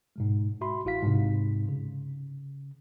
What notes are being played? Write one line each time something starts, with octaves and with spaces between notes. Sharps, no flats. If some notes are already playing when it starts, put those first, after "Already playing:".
G#2 B2 G#3
F#4 E5 B5 C6
A1 E4 F#4 F5 B6
G#2 C3
C#3